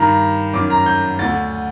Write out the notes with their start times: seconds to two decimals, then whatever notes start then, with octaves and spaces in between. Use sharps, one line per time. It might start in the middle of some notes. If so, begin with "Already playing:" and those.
Already playing: G2 D#3 A#5
0.53 F#2 D#3 D6
0.70 A#5
0.86 G6
1.19 D2 D3 A6